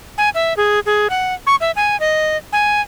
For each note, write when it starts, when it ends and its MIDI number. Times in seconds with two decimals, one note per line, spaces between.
0.18 0.30 80
0.35 0.53 76
0.57 0.80 68
0.86 1.08 68
1.10 1.34 78
1.47 1.56 85
1.61 1.71 76
1.76 1.99 80
2.00 2.37 75
2.53 2.81 80